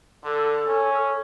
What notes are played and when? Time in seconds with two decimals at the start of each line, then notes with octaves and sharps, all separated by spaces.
0.24 D3 A4
0.67 C#4